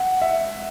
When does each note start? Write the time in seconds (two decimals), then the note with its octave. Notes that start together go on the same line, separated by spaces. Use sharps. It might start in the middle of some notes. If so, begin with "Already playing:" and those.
Already playing: F#5
0.22 E5